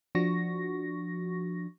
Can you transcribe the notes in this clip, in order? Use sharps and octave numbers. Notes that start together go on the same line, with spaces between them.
F3 D4 F#4 C#6 A#6